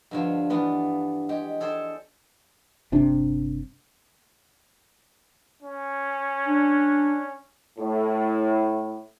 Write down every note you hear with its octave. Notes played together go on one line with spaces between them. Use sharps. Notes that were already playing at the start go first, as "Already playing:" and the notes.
G2 D3 F3
E3 B3 D4 F4
G#3 G4
G#4 A4 C5 D5
G1 C3 D4
C#4
D4
A2